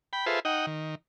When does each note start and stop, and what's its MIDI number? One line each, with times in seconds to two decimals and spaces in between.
0.13 0.26 79
0.13 0.26 83
0.26 0.40 65
0.26 0.40 68
0.26 0.40 69
0.26 0.40 71
0.26 0.40 72
0.26 0.40 76
0.45 0.66 63
0.45 0.66 75
0.45 0.66 78
0.45 0.66 79
0.67 0.95 51